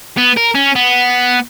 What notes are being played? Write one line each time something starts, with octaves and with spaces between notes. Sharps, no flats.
B3
A#4
C#4
B3